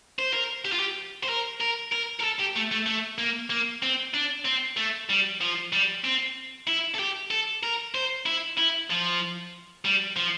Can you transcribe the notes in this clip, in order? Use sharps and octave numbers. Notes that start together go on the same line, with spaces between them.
C5
A#4
G4
F4
G4
C5
A#4
A#4
A#4
A#4
A4
G4
A3
A3
A3
A#3
A#3
C4
D4
C4
A3
G3
F3
G3
C4
E4
A4
G4
A4
A#4
C5
E4
E4
F3
G3
F3